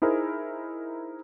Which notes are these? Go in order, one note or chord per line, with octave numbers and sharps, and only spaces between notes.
D#4 E4 G#4 A#4 C5